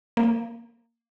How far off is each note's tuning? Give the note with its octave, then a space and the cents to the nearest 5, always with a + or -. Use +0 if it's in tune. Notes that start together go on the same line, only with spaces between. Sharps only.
A#3 -10